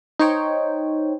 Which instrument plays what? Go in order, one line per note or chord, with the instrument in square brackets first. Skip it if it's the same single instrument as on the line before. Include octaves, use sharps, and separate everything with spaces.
[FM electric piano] D#4 C5 C#5 G5